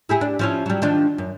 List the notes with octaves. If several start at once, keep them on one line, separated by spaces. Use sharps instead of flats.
E4 G4 G#4
D4
F3 C#4 E4
F#3 G3
D#3 F3 D4
F#2